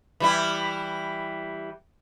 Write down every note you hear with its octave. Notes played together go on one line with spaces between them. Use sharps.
E3 G3 E4